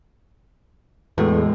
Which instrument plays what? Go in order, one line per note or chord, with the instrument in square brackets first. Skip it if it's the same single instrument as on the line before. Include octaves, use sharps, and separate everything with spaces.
[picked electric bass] E2 A2 [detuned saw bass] G#3 [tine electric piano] F#4 A4 B4